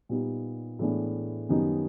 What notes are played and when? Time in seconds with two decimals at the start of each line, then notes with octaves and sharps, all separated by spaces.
0.09 A#2 G3 B3 D#4 G4
0.79 A2 E3 G#3 B3 D4
1.49 F#2 D#3 G3 B3 D#4